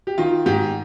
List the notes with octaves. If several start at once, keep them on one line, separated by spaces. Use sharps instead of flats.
G4
D#3 F4
G#2 G4